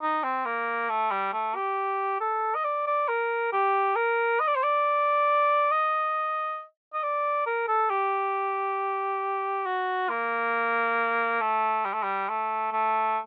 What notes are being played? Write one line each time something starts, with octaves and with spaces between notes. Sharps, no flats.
D#4
C4
A#3
A3
G3
A3
G4
A4
D#5
D5
D5
A#4
G4
A#4
D#5
D5
C5
D5
D#5
D#5
D5
A#4
A4
G4
F#4
A#3
A3
G3
A3
G3
A3
A3